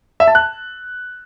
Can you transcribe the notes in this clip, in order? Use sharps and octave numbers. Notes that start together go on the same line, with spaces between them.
E5
A5
F#6